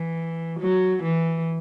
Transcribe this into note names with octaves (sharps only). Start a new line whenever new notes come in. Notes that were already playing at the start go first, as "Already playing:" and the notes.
Already playing: E3
F#3
E3